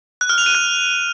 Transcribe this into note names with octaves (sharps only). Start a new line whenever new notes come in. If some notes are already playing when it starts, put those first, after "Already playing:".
F#6
F6
F7
D#7
F#6